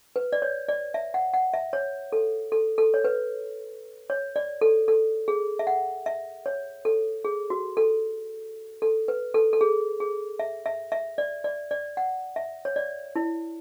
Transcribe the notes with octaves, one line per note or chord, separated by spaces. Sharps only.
B4
D5
C#5
D5
E5
F#5
F#5
E5
C#5
A4
A4
A4
C#5
B4
C#5
D5
A4
A4
G#4
E5
F#5
E5
C#5
A4
G#4
F#4
A4
A4
B4
A4
A4
G#4
G#4
E5
E5
E5
D5
D5
D5
F#5
E5
C#5
D5
E4